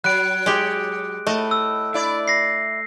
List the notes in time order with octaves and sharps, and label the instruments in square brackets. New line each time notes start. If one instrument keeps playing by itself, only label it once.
[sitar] F#3 [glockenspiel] F#6 D7
[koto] G#3 G4
[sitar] A2 D#5 [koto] A3
[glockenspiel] E6
[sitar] E4 D5
[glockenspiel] A#6 C7